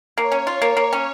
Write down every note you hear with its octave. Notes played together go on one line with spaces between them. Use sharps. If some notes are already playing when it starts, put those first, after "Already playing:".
A#3 C#5
C#4
F4
A#3 C#5
A#3
C#4